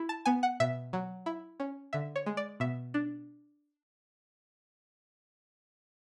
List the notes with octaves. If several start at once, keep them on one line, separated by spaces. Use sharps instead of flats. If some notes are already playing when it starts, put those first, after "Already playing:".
Already playing: E4
A5
B3 G#5
F#5
B2 E5
F#3
E4
C#4
D3 E5
C#5
G#3
D5
B2 E5
D4